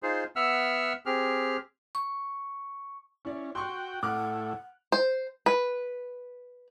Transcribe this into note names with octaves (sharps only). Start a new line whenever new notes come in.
D#4 F4 G#4 C5
B3 E5 F#5 E6 F6
C4 G4 G#4 F6
C#6
C#4 E4 D5
F#4 G5 C6 C#6
A2 F#5 D6 F6 F#6
C5
B4